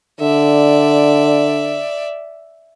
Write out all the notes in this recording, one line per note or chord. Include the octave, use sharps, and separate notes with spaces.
D3 D5 E5